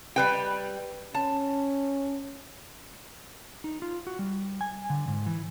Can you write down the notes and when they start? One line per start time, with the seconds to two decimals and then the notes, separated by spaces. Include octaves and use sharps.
0.16 G3 B4 G5
1.14 C#4 A5
3.64 D#4
3.82 F4
4.07 F#4
4.19 G3
4.61 G#5
4.90 D3
5.08 G#2
5.26 E3